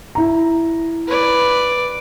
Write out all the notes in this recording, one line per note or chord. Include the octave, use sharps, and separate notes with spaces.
E4 A#5
B4 D5